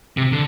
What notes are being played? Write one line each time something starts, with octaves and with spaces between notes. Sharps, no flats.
C3
D3